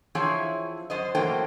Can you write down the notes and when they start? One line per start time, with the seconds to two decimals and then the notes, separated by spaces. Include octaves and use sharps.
0.15 E3 F3 C4 E4 G#4 C#5
0.90 F#2 C5 D#5
1.15 A2 E3 F#3 A#3 C5 G5